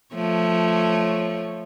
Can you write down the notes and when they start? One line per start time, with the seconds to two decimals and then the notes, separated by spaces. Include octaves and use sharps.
0.15 F3 A3 C#5